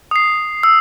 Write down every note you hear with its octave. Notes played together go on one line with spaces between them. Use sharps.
D#6 C7
E6